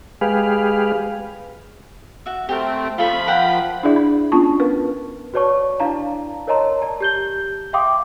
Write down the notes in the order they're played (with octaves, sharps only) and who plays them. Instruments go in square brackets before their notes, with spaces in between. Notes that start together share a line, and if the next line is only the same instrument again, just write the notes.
[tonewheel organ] G#3 G4 G#4 B4 F5
[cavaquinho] F#4 E5
[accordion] A3 C4 [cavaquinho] G4 A#4
[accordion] F3 B5 [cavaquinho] F4 A4 C#6
[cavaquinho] A#4 F#5 G5
[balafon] D4 E4 G#4 D5 E5
B5
B3 C#4 D4 F4 A5 C#6
A#4 B4
[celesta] F#4 B4 C#5 D5 A5 C#6
D4 E4 D5 F5 A5 A#5
A#4 C#5 D#5 A5 A#5 C6
D5 A5
G4 G6 G7
E5 F5 G5 C6 D6 D#6